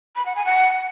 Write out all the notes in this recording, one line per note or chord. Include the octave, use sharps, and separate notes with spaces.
B5
F#5
G#5
F#5